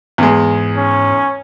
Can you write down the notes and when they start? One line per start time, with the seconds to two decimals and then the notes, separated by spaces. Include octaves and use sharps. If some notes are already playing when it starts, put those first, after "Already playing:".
0.18 E2 G#2 G#3
0.78 C#4